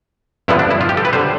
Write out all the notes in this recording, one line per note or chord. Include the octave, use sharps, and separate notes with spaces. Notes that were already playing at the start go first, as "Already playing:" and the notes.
G2 D3 F3 B3 E4
D4
E4
F4
G4
A4
B4
D3 G3 C5